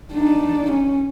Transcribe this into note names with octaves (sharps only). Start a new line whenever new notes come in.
D4 D#4
C#4